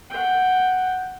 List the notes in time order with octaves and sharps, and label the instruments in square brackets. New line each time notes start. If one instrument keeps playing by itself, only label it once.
[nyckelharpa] F#5 G5